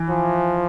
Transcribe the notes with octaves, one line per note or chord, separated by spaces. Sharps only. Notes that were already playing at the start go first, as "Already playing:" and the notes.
Already playing: E3
F3